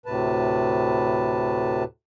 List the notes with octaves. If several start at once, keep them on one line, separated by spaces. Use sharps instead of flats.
D2 A2 C3 B4 A5